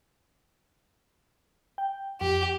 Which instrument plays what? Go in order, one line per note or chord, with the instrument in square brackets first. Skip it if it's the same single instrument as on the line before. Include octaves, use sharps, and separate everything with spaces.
[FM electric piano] G5
[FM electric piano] F2 [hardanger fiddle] G4